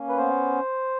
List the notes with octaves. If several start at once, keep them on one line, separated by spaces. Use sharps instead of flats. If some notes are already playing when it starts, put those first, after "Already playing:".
Already playing: A#3 C#4
B4
B3 C5